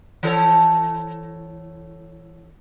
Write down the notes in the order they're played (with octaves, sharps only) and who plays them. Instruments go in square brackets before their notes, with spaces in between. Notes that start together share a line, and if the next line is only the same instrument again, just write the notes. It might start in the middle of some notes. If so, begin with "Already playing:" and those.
[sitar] E3 A4 C#5